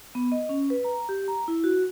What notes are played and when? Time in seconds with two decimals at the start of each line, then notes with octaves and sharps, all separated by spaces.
0.15 B3
0.32 D#5
0.49 C#4
0.70 B4
0.84 A#5
1.09 G4
1.28 A#5
1.48 E4
1.64 F#4